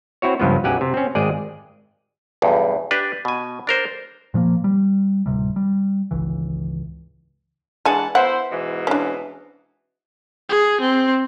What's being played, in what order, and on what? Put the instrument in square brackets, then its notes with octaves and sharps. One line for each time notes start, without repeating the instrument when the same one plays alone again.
[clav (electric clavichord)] C4 E4 F#4 C#5
C#2 G2 F3 B3
B1 F#2 G4 F#5 G#5
C3
C4 C#4
G#1 G#3 G#4 D5 G5
B1 E2 G2
D4 G4 B4
B2 G#5
D4 A#4 C5
[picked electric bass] A#2 F3 G3 A#3
G3
D1 C3 G3
G3
G#1 C#2 E3
[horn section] E3 F#5 A5 [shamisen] G#3 D4 G#5
[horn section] B3 E4 C5 [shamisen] F#5
[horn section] G#2 B2 E3
[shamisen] C#4 D4
[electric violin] G#4
C4